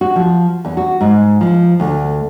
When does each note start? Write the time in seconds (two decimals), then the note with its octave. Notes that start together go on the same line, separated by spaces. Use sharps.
0.01 F#4
0.16 F3
0.65 E2
0.77 F#4
1.01 G#2
1.41 F3
1.80 D2